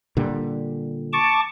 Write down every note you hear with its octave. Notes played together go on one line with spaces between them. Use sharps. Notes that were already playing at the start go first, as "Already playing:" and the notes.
A#2 D3 G3
A5 C#6 D6